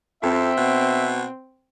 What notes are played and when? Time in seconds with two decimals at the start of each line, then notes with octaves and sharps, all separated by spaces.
0.23 F2 C4 E5
0.57 B2